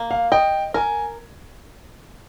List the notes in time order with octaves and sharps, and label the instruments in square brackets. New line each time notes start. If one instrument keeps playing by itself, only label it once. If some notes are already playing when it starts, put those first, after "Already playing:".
Already playing: [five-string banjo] A#3
[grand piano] F5
[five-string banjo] D#5 [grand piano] G5
[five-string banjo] A#4 [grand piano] G#5